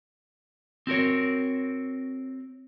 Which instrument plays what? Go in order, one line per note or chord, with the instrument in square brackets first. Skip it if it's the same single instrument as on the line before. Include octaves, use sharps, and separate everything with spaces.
[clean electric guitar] C4 F#4 A#4 C#5